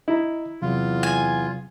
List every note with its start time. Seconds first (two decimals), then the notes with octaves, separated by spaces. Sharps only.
0.08 E4 D#5 A#5
0.62 E2 C3 F#3 F4
1.03 G#5